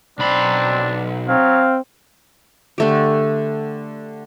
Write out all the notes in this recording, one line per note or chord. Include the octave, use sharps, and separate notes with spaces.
B1 C4 D4 B5
F#3 C4 F5
D3 A3 G4